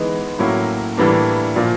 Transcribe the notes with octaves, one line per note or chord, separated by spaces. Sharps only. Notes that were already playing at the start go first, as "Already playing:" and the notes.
Already playing: E3 G#3 B3 D#4
A2 F#3 A#3 C#4 E4
A2 E3 G3 A#3 D4
A#2 F3 A#3